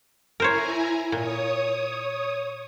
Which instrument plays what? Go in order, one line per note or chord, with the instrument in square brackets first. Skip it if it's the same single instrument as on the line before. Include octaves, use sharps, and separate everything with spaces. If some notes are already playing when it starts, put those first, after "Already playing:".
[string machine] E4 G#5 A#5 [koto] A#4 C5 C#5
[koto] A#2 [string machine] C#5 D#6